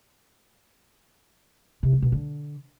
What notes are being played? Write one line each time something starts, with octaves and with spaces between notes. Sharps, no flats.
C3
G#3
B2
D3